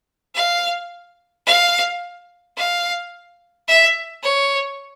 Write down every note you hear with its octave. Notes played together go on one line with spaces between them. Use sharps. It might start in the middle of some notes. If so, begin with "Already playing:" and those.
F5
F5
F5
E5
C#5